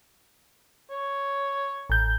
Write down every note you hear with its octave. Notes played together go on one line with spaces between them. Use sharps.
C#5
A1 G6